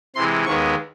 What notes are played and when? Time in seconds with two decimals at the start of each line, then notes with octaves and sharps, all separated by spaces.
0.16 C3 E3 G#3 C6
0.45 D#2 D#3 G#3 B3 C#6